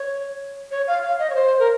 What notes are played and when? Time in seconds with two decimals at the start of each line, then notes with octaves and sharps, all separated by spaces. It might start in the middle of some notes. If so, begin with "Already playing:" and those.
Already playing: C#5
0.71 C#5
0.87 F5
1.03 F5
1.19 D#5
1.30 C#5
1.35 C5
1.59 A#4